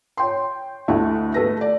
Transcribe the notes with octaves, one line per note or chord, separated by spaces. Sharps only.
C#5 G5 C6
D2 A3 E4 D#5 F#5
A3 A4 B4 A#6
D5